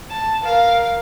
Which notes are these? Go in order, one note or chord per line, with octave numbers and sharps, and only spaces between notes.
A5
A#4 F5